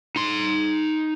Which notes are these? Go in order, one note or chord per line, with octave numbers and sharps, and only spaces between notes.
D#4 C6